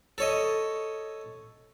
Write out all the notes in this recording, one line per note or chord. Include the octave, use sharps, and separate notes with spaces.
A4 C#5 D#5